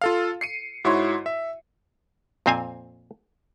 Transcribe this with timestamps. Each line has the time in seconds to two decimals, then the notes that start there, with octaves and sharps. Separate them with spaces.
0.01 F4 A4 F5
0.41 C7 C#7 D#7
0.84 G#2 E4 F#4 C#5 C6
1.26 E5
2.46 F2 A#2 C4 C5 F5 G#5